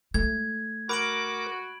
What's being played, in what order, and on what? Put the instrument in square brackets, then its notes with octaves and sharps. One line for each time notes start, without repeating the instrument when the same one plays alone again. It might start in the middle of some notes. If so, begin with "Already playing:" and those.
[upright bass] A3 [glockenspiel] G#6
[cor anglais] F#4 [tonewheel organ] A#4 D6 [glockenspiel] B5 D7 F#7